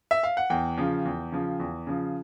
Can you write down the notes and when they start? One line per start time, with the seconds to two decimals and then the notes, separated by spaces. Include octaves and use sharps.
0.11 E5
0.23 F5
0.37 F#5
0.50 E2 G5
0.78 C#3 F3
1.05 E2
1.32 C#3 F3
1.60 E2
1.87 C#3 F3